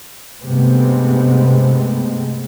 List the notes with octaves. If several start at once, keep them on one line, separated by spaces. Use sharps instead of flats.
G2 C3 G#3 A3 B3 C4